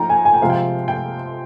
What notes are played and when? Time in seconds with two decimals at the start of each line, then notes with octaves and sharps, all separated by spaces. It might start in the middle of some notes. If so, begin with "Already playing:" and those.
Already playing: F3 D#4 G5 A#5
0.09 G#5
0.25 G#5
0.34 G5
0.42 C3 F3 G#3 F5
0.50 G5
0.88 G5